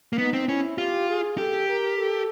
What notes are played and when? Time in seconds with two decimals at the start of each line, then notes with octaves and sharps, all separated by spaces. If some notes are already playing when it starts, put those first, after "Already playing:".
0.13 A#3
0.18 B3 D#4
0.33 C4
0.48 C#4 E4
0.77 F4 G4
1.08 G#4
1.38 G4 A4
1.68 A#4
1.97 A4